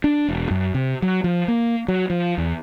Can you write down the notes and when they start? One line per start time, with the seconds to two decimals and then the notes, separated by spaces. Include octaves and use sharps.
0.04 D4
0.29 E1
0.51 F#2
0.74 C3
1.02 F#3
1.24 F3
1.48 A#3
1.88 F#3
2.10 F3
2.38 E2